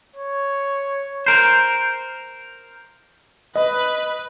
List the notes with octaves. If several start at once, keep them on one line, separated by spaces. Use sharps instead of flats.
C#5
A#4 C5
B4 D#5